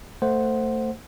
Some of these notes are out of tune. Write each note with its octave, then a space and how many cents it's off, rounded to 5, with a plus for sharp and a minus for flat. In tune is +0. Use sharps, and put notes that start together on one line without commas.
A3 +20 C5 +0 F#5 +0